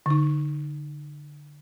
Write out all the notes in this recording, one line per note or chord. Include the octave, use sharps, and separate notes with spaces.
D3 D#4